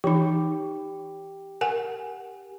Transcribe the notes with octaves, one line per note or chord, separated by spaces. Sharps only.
E3 D#4 G4
A#4 F#5 G#5